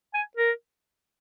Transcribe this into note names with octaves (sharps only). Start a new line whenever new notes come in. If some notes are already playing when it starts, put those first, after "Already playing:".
G#5
A#4